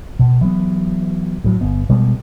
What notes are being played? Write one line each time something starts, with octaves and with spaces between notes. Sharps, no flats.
B2
E3 F#3 B3
A2 F#3
G1 B3
B2 G3 G#3 B3